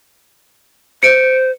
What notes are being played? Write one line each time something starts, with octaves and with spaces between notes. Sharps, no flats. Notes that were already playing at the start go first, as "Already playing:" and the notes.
C5 C#7 D7